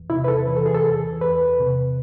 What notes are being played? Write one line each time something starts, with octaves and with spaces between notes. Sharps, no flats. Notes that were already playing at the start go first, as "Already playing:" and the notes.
Already playing: E2
C3 E4
B4
A4
E3 B4
A4
G#4
A4
E2
E2 B4
C3